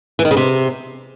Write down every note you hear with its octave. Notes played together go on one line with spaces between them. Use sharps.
E3
D#3
C#3
C3